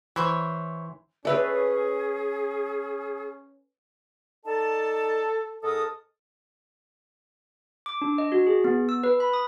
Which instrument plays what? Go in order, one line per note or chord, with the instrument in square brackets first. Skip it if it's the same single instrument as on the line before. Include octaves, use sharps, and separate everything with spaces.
[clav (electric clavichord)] E3 [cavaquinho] E4 C5 C#5
[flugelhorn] C#4 [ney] G#4 [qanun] A4 B4 C#5 [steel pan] D5 E5
[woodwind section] D#4 D5 A5 [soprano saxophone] A4
[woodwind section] G#2 A#4 D#6 [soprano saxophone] A4
[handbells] D6
D4
D#5
F#4
G#4
B3
E6
B4
B5
D#6